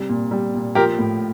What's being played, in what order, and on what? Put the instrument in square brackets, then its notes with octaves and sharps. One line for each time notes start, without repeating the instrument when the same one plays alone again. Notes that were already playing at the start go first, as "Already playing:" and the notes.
Already playing: [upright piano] C3 G3
A#2
G3
A#2
F3 G4 A#4
A2